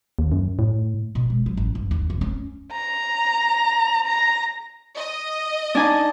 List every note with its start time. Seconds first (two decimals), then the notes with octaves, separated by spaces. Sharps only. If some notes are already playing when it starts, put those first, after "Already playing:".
0.19 D#2
0.32 F#2
0.59 A2
1.15 B2
1.30 G#3
1.46 F#3
1.57 A1
1.75 G2
1.91 D#2
2.10 F1
2.21 C#4
2.73 A#5
4.06 A#5 A#6
4.96 D#5
5.75 D4 D#4 G#5